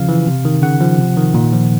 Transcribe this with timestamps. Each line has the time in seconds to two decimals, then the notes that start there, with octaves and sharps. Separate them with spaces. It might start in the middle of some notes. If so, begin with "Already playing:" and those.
Already playing: C#3 F3 F5
0.09 E3
0.27 C3
0.45 D#3
0.62 C#3 F#5
0.81 F3
0.98 C3
1.17 D#3
1.34 A#2
1.52 F3